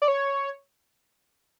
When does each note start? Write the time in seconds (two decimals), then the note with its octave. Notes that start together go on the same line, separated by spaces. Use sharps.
0.02 D5
0.08 C#5